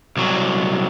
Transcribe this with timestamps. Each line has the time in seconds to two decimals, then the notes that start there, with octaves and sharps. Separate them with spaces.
0.16 C2 F#3